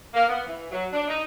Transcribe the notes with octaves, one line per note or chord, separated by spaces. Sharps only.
A#3
B3
E3
F#3
D4
D#4